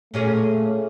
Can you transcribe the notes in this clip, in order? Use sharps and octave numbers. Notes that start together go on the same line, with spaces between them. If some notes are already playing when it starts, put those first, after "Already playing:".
A#2 A3 C#4 G#4